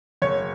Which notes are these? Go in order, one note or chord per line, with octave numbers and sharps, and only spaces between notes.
F#1 C#5